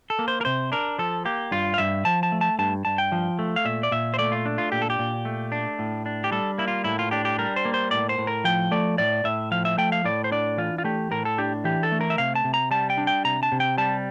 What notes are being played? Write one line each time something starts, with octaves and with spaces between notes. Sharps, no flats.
A4
A#3
C5
A#4
C3 C5
D4 A#4
F3 A4
A#3 G4
G2 F4
F5
G2 E5
F3 A5
A5
A3
A5
G2 A5
G2 A5
G5
F3
A3
F5
A#2 E5
D5
A#2 E5
C5
A3 D5
F4
D4
F4
A#2 G4
A4
G4
A#2
A3
D4
A2
D4
G4
G3 A4
A#3 E4
F4
A2 E4
F4
D4 G4
G4
G3 A#4
C5
A#3
C5
A2 D5
C5
A2
A#4
F3 G5
A3 D5
A2 D5
A2 E5
F3 F5
E5
A3 G5
F5
A2 D5
C5
D4 D5
E3 F4
F4
A3 G4
A2 A#4
A4
D4 G4
E3 G4
A4
A3
A#4
E5
C3 F5
A5
C3
A#5
G3 A5
G5
D4
G5
C3 A#5
A5
C3
G5
G3 A5